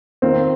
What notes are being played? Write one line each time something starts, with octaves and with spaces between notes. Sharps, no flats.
D#3 C4 F4 A#4